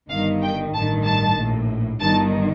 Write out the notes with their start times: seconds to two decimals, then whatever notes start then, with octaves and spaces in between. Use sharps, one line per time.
0.10 G1 G2 D#3 F5
0.43 G5
0.73 A1 G2 D#3 A5
1.05 A5
1.37 A#1 A2
2.00 G1 G2 D#3 A5